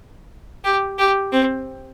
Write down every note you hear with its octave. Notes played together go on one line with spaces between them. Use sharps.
G4
G4
C4